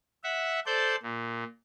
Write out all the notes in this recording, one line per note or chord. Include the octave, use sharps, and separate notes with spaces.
E5 F#5
A4 C5 D5 G6
A#2